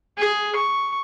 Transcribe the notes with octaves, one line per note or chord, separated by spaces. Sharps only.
G#4
C#6